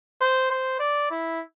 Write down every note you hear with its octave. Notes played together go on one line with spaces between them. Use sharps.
C5
C5
D5
E4